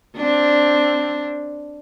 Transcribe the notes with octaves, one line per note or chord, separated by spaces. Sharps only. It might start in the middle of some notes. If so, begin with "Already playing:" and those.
C4 D4